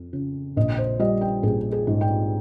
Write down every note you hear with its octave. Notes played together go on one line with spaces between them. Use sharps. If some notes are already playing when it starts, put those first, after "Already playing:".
Already playing: F2
C#3
A#1 D#5
C5
G3 D#5
G5
A#1 G#4
G#4
G#2
G5